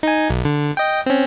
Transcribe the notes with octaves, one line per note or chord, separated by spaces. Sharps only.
D#4 G#5
B1
D3
D#5 G5
C4 C#4